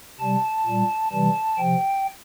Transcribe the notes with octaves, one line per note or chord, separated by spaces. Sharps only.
C3 G3 A5
A#2 G3
C3 E3 G3 A5
C3 F3 G5